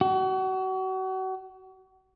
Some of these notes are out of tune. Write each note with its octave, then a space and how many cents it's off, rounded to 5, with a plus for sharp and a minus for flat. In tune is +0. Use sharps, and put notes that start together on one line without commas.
F#4 +35